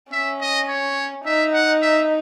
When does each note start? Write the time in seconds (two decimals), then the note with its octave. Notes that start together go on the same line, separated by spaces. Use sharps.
0.12 C#4 E5
0.41 D#5
0.69 C#5
1.25 D#4 E5
1.54 F#5
1.82 E5